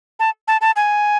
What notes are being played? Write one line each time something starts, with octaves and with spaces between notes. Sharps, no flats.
A5
A5
A5
G#5